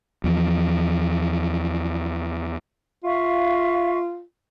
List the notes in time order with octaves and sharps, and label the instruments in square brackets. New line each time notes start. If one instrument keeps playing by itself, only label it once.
[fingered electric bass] E2 F3
[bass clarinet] F4 [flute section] E5 F5 C#6